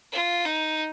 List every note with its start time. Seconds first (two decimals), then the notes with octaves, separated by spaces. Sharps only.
0.13 F4
0.45 D#4